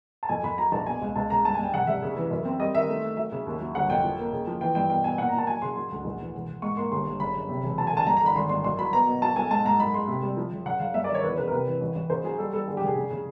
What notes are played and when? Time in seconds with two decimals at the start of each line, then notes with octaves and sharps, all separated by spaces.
0.23 A5
0.29 F2 G#5
0.43 F2 B5
0.58 F#3 A#5
0.72 A#1 A5
0.87 B2 G#5
1.02 C#2
1.16 C#2 A5
1.30 C#3 A#5
1.45 G2 A5
1.54 G#5
1.59 G2 G5
1.74 F1 F#5
1.87 F1 E5
2.02 C#3
2.16 E3
2.31 F#2
2.45 C4
2.60 G3 D#5
2.75 D#3 E5
2.89 A3
3.02 A3
3.17 F#3 E5
3.32 C#3
3.46 D#2
3.60 F#3
3.75 G1 F#5
3.90 F2 G5
4.04 F3
4.18 A#3
4.32 C#3
4.47 F3
4.61 E3 G5
4.75 G2 G5
4.90 B2 G5
5.04 B2 G#5
5.18 A#2 F#5
5.29 A#5
5.33 A#2
5.38 A5
5.47 F#3 G#5
5.62 C#3 C6
5.76 F#3 C6
5.91 D2
6.05 A#1
6.20 E3
6.34 E1
6.48 E1
6.62 G#2 C#6
6.77 A#3 C6
6.92 G1 C6
7.06 G1
7.20 F#1 B5
7.35 F#1
7.49 C3
7.63 E1
7.78 F#3 A5
7.87 G#5
7.93 D3 A5
8.07 G2 A#5
8.17 A#5
8.21 D3 B5
8.35 G#1 C6
8.49 G2 C6
8.64 F#2 C6
8.79 F#3 B5
8.93 B3 A#5
9.07 B2
9.22 F#3 A5
9.36 B1 G#5
9.50 G#2 A5
9.65 G#2 A#5
9.80 F#2 B5
9.94 G#3 C6
10.08 C3
10.23 G3
10.37 F3
10.52 F#1
10.66 F#1 F#5
10.80 F#1 F5
10.94 G2 E5
11.04 D5
11.09 D#3
11.15 C#5
11.23 E2 B4
11.38 C#3 B4
11.48 A#4
11.52 C3 B4
11.67 E3
11.81 A1
11.95 A1
12.10 C#3 C5
12.24 F#3 G#4
12.38 G3 A4
12.53 G3 A4
12.68 D3 G#4
12.77 G4
12.82 F1 G#4
12.96 C#3
13.11 C#3